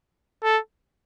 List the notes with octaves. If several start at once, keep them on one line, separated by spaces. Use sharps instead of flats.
A4